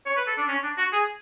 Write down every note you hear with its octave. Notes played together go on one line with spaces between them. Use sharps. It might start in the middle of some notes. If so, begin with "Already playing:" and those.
C#5
B4
A4
D4
C#4
D4
F#4
G#4